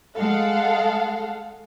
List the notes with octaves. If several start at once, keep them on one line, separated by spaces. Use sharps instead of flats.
G#3 A4 F5 F#5